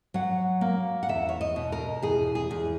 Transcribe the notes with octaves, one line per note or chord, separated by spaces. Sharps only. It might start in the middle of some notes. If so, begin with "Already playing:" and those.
F#3 F#5
A#3
F#5
E2 E5
C#5
D#5
B2
A#4
E2 G#4
G#4
E2